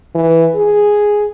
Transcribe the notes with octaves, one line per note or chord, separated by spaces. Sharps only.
E3
G#4